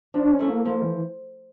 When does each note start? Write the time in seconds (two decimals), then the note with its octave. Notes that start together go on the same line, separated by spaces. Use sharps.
0.14 F3 D4
0.32 C#4
0.39 A3 E4
0.48 A#3
0.65 F3 A#3
0.82 E3